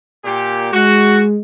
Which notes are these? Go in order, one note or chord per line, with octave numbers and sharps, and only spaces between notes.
A#2 G4
G#3 F#4